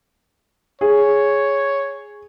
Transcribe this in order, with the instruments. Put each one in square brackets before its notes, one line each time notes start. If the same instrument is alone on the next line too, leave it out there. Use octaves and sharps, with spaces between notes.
[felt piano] G#4 [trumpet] C#5